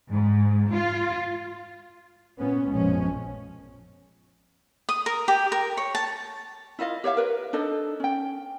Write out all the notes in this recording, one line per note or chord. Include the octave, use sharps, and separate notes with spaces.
G#2
F4
A#2 B3 C#4
A#1 F#2 B2 F3 G#3 C#4
D#6
A#4
G4
A#4
C#5
A5
E4 F4 D#5 F5
G4 C#5 E5 F5
A#4 B4
D4 D#4 A4 D#5
C#4 G5